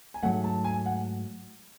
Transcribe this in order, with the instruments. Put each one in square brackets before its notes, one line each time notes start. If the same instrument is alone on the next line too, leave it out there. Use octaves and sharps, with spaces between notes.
[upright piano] G#5
[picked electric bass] G#2 F#3 A3 [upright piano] F#5
[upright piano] A5
G#5
F#5